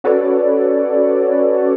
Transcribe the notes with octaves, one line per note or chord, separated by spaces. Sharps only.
C#4 F#4 A4 B4 C#5 D5